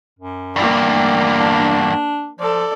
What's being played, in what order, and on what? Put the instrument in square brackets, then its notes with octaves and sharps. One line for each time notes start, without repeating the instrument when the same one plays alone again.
[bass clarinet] F#2
[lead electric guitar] E2 G2 [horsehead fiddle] A#3 D5
[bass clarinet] A3
D4
[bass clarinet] F3 [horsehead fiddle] A4 D5